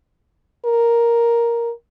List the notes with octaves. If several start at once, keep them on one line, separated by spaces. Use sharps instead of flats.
A#4